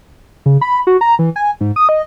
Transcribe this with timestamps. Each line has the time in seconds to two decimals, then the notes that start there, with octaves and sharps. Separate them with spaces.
0.46 C#3
0.61 B5
0.87 F#4
1.01 A#5
1.19 E3
1.36 G#5
1.61 G#2
1.76 D#6
1.89 D#5